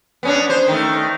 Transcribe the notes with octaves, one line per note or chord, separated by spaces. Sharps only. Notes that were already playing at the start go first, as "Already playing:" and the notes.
B3 C#4 D4
C5
D#3 A3